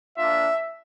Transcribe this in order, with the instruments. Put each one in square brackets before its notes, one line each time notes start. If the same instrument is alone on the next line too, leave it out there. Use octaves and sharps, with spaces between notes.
[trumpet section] A#3 D4 F4 E5